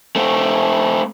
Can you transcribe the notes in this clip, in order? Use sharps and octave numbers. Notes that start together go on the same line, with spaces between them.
A3 C4